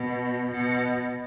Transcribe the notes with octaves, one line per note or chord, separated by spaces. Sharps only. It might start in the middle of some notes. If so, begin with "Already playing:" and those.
Already playing: B2
B2